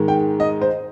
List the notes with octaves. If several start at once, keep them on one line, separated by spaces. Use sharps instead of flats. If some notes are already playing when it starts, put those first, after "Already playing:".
Already playing: G#2 D#3 G#3
G5
D#5
C5